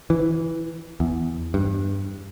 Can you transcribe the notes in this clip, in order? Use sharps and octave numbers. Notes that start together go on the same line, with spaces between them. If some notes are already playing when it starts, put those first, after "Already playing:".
E3
E2
G2